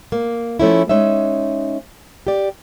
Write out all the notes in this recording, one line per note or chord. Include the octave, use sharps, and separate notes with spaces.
A#3
F3 A3 C#4 E4
G#3 C#4 D#4 E5
G4 D5